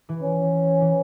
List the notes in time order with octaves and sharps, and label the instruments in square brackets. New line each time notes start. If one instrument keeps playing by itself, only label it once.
[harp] E3
[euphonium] C#4
[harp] E3